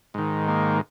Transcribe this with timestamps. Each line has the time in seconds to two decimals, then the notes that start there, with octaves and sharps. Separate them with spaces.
0.14 G#2 D#3
0.48 A#3